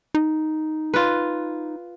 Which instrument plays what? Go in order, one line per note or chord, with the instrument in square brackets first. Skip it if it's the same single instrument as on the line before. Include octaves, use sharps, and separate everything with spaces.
[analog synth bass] D#4
[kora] F4 B4